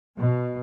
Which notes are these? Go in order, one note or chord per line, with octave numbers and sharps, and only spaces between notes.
B2